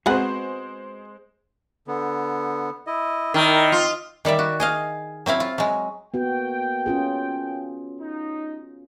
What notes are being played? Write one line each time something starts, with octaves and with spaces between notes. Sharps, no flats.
G#3 B3 C4 F#4 G#4 C5 F#5 B5
D3 B3
E4 D#5
D#3 E4 A#4 D5
C4 F4 C6 D6
D#3 G3 D5 E5
F#4
G#4 D#5 F5
F#3 C4 E4 F5
F4
F#3 G#3
A#3 B3 F#4 G5
C#4 F4 G#4
D#4